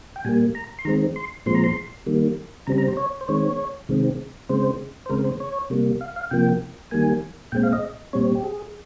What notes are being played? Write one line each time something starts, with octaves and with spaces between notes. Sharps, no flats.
G5
A#2 G3 A#3 G#5
A#5
C6
D#3 G#3 C4 A#5
C6
A#2 F3 G#3 C4 C6
A#5
C6
D#3 G3 A#3
C#3 G3 C4 A#5
A#5
C5
C#5
C5
D#3 G#3 C4 C#5
C3 D#3 G#3 C4
C#3 G#3 C4 C5
C5
C#3 G#3 C4 A#4
C5
C#5
C3 G3 A#3
F5
F5
C3 F3 A#3 G5
D#3 G3 A#3 G#5
A#2 G#3 C4 G5
F5
D#5
A#2 G3 C4 C#5
G4
G#4